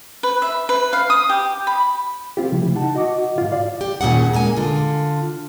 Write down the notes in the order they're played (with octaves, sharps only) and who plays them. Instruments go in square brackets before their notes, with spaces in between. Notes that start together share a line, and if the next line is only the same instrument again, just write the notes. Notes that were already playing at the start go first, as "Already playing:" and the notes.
[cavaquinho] B4
E5
B4
F5
D#6
G4
B5
[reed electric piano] C4 F4 G4
C#3 F3 A3 E4 G4
D#4 F#5 A5
F#4 D#5 F#5 D6
G#2 F4
D5 F5
[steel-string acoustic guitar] G4
D#2 A#2 C#4 G#4 F#5
A#2 G#3 A#3 G#5
D3 F4